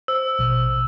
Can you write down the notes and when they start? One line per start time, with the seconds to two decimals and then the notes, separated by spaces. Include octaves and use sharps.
0.08 C5 E6
0.39 A1 B2